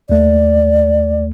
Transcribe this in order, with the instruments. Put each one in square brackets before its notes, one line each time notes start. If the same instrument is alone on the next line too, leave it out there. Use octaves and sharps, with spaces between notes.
[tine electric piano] D#2 A3 [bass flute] D5